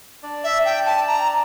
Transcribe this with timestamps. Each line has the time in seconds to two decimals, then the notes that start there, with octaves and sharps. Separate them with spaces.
0.23 D4 D5
0.44 E5
0.65 G5
0.86 A5
1.07 A#5